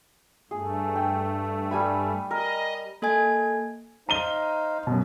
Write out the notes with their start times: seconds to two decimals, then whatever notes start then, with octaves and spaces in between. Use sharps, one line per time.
0.51 G2 A3 G#4
0.96 G5
1.71 G3 G#5 B5
2.31 A#4 D#5
3.02 A#3 A4 D#5 G#5 G#6
4.09 D#4 C5 F5 A#5 D#7 G7
4.87 F#2 B2